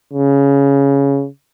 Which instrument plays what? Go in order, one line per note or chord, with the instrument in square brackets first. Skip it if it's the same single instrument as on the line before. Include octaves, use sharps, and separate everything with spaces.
[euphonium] C#3